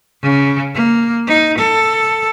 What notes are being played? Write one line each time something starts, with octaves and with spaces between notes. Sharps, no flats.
C#3
A#3
D#4
A4